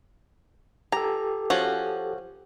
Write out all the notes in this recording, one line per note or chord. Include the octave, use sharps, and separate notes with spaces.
G4 A4 A#5
F3 C#4 F#4